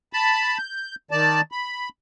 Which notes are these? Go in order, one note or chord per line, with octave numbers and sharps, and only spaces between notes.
A5 B5
G6
D#3 D5 A5
B5